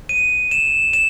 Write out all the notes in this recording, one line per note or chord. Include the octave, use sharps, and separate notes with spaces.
D#7
E7
E7